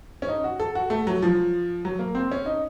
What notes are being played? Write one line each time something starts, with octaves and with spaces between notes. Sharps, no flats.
C#4
D#4
F#4
A4
F#4
A3
F#3
F3
F#3
A#3
C4
C#4
D#4